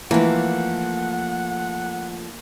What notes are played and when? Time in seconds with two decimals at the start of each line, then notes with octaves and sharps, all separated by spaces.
0.11 E3 F3 A3 A#3 F#5